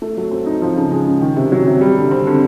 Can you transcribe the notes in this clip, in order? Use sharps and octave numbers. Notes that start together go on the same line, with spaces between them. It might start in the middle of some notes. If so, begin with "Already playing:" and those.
A3
F#3
C4
D#4
F3
C#3
G#3
C#3
D#3
C3
F#3
C3
G3
D3
C4
D3